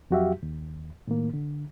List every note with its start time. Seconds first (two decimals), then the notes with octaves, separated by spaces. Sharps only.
0.10 F2 F#3 F#4 G4 E5 F5
0.43 D#2
1.07 A2 D#3 A#3
1.34 D3